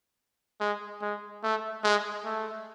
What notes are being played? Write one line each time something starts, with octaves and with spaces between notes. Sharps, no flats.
G#3
G#3
A3
G#3
A3